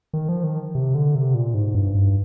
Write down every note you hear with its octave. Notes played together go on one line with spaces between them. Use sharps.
D#3
F3
D#3
C3
D3
C3
A#2
G#2
G2
G2